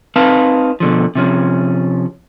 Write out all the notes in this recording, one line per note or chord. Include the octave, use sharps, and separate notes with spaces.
C4 D#4 B4 F5 A5
B2 D3 F3
C3 F3 C#4